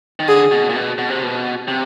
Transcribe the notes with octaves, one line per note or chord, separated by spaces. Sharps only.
D#3
D3 G#4
B2
A#2
B2
B2
C3
B2
C3